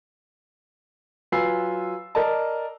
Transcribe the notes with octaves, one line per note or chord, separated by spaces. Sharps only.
F#3 F4 B4 G#5 E6 C7
A#4 D5 D#5 A5